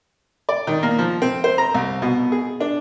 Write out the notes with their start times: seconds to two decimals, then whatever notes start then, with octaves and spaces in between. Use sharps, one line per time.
0.49 D5
0.67 D#3
0.83 A#3
0.98 F3
1.22 C4
1.44 C5
1.58 A#5
1.74 C2
2.02 B2
2.32 G#4
2.60 D4